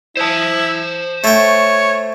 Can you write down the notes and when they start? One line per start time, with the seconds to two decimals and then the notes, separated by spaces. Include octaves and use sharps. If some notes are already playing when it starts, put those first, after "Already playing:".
0.17 E4 C5 A5
1.24 A3 C#5 G5